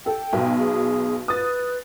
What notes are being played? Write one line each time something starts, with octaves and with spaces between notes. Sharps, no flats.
A4 G5
B1 B2
G#4
B4 D#6 A6